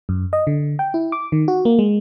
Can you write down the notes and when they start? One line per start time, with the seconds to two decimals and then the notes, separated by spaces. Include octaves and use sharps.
0.09 F#2
0.33 D#5
0.47 D3
0.79 G5
0.94 E4
1.12 D6
1.32 D#3
1.48 F#4
1.65 A#3
1.79 G#3